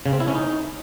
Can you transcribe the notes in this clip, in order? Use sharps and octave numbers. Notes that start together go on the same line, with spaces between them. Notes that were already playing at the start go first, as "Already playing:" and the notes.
C#3
C4
E4
C#4
D#4